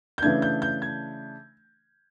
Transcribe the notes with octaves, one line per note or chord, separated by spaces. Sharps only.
G6
C#3 E3 A3 D4 G#6
G6
G6
G#6